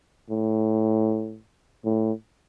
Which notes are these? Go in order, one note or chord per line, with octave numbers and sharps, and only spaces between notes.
A2
A2